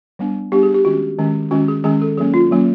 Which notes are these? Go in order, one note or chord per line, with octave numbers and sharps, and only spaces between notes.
G3 B3 D4
G3 B3 D4 G4
G#4
G4
D#3 G#3 C#4 F#4
D#3 G#3 C#4
D#3 G#3 C#4 F#4
G#4
D#3 G#3 C#4 G#4
A4
F#3 A#3 C#4 G#4
F4
F#3 A#3 C#4